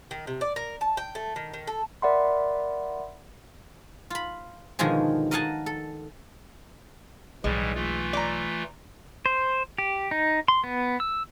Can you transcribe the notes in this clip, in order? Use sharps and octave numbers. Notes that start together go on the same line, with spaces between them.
D#3
C3
D5
A#4
A5
G5
A3
D#3
D#3
A4
A#4 D5 E5 F#5 B5 C6
F4 B5
B2 D3 D#3 F3 G#3 G#4
A#4 D#5 F5 F#5 G#5 A5
A4
B1 A2 E3 G3 G#3
E3 A3 F4
D5 A#5
C5
G4
D#4
C6
B3
E6